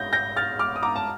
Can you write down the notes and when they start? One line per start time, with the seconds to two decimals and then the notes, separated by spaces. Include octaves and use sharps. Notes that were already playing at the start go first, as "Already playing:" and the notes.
Already playing: G6 A#6
0.13 G6 A#6
0.36 F6 A6
0.59 D6 F6
0.76 D#6
0.83 A#5 D6
0.96 A5